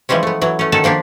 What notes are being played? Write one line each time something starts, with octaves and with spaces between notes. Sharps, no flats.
E3 F3 G3 G#3 C#4
A3 B3
E3 F#3
A3 C#4
D#3 C#4 F#4 A4 A5
F3 A#3 D4 G4